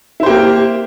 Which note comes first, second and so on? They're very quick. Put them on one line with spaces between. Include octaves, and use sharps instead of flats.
E4 C5 G4 A#3